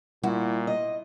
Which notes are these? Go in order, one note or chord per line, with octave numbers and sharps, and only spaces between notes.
A#2 G3 E4 F#4
D#5